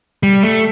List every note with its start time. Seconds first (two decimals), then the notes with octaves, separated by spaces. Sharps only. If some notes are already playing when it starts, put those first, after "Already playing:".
0.23 G3
0.42 A3